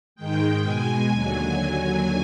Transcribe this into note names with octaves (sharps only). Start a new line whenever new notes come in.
G#2 D#3 G#3 G5
B2 G#3 G#5
D#2 D3 F#3 G#5